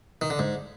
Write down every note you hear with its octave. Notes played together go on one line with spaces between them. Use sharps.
D#3
D3
G#2